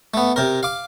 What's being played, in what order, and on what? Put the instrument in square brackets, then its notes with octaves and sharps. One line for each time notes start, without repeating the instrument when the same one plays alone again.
[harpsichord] A3 B3
C3 A#4
F5 D6